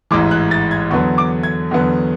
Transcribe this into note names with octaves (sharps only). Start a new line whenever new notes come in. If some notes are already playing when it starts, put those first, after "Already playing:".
A1 G#2 E3 D6
F#6
A6
G#6
E2 D3 F#3 B3 C#6
D6
G#6
E2 D3 F#3 B3